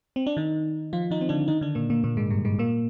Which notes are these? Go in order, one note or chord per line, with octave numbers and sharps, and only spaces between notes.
C4
D4
D#3 D#4
F3 F4
D#3 D#4
C4
D3 D4
D#3 D#4
D3 D4
A#2 A#3
A#2 A#3
A#2 A#3
G#2 G#3
G2 G3
G#2 G#3
A#2 A#3